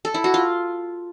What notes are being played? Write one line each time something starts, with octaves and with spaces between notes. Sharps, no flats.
A4
E4
F#4
F4